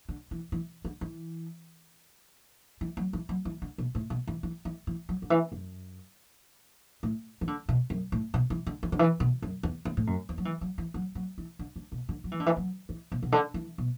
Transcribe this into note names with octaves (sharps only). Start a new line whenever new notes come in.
D3
E3
E3
D3
E3
E3
F#3
E3
F#3
E3
D3
B2
A2
B2
E3
E3
E3
E3
F#3
D3
E3
F#2
A2
E3
D3
B2
F#2
A2
B2
E3
D3
E3
D3
E3
B2
F#2
E2
E2
A2
F#2
E2
F#3
E3
F#3
E3
F#3
F#3
E3
D3
D3
B2
D3
F#3
E3
D3
E3
F#3
E3
B2
B2
D3
E3
B2